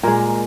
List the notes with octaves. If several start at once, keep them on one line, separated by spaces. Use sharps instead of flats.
A#2 G#3 A#4